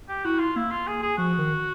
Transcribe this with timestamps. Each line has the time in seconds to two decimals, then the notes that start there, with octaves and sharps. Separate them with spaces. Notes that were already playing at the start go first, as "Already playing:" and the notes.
0.08 G4
0.24 E4 F#4
0.40 F4
0.55 A#3 E4
0.70 F4
0.87 G#4
1.02 G#4
1.18 F3 F#4
1.38 D#3